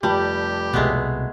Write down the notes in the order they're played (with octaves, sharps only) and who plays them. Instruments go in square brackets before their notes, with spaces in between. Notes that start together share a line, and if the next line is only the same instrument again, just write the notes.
[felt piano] F1 A5 B5 [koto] G3 [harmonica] G4
[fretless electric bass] C2 B2 [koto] G#3 A3 B3